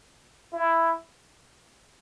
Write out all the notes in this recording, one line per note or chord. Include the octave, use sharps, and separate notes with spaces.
E4